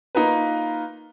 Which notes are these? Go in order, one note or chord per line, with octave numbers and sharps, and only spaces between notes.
A#3 D#4 F4 A#4 B4